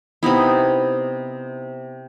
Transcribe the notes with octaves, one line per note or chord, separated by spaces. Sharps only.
C3 B3 D#4 E4